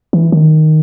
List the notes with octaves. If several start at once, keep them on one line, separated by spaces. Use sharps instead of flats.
E3
D#3